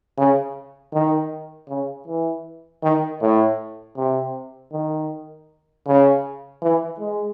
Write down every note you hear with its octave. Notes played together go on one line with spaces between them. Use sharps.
C#3
D#3
C#3
E3
D#3
A2
C3
D#3
C#3
E3
G#3